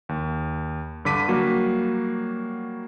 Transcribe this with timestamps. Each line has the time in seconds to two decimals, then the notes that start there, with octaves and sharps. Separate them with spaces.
0.09 D#2
1.05 G2 D3 D6 B6 D#7
1.28 F#3 G3 A#3 F#4